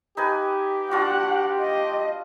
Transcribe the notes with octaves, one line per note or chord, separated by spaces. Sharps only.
D#4 G4 B4 G#5
D4 F4 F#4 F#5
D#5